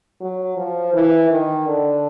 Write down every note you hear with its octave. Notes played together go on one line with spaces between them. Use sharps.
F#3
F3
E3
D#3
D3